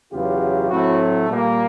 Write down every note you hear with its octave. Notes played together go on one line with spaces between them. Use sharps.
E2 C#3 F#3 B3 F4 G4
A2 F#3 A3 C4 E4 F#4
A#2 G3 A#3